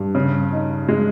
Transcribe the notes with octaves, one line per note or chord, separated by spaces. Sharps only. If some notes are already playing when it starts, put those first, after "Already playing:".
Already playing: G2
C#3
D#4
G#3